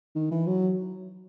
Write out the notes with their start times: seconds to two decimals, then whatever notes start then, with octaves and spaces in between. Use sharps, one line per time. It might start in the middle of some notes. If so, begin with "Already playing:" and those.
0.15 D#3
0.31 E3
0.47 F#3